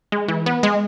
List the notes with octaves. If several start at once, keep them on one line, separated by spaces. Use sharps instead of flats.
G#3
E3
B3
G#3